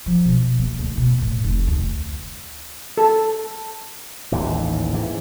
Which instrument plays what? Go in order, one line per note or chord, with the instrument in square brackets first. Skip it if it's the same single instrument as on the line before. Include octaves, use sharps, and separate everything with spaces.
[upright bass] F3
B2
A#3
D2
B2
A2
F1
D2
[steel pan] A4
[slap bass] A1 D#2 G#2 E3
G#2 E3